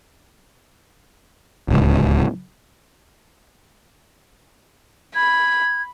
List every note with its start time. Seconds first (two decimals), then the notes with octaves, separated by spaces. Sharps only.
1.68 D1 C#2
5.15 B5 G#6